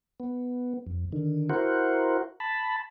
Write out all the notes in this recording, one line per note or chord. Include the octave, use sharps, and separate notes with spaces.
B3
F2
D3 D#3
E4 F#4 A#4 C5 F#5
A5 B5